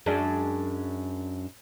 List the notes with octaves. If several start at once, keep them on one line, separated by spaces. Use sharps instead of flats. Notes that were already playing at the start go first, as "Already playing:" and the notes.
F#2 G#3 D4